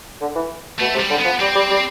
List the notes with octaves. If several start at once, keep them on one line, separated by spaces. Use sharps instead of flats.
D3
E3
B2 A3
C3
G3
D3
F3 B3
G3 C4
G3
G3